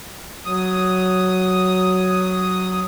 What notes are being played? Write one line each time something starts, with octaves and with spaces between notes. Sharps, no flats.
F#3 D#6